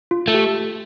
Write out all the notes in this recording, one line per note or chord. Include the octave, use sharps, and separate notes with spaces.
F4
A3
G4